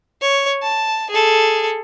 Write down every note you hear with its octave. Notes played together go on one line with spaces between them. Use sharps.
C#5
A5
G#4 A4